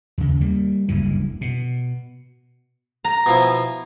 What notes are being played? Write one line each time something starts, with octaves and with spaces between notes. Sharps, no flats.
D#2 C#3
G3 A#3
F#1 D2 G2 E3
B2
A#5
B2 F3 E4